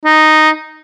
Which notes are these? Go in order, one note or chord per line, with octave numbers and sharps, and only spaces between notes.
D#4